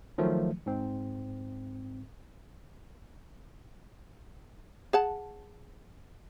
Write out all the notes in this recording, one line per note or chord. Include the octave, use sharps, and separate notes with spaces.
D#3 F3 F#3 A3
G#2 C4
G#4 F#5 A5